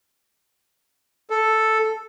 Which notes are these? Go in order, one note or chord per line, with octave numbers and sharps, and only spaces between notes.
A4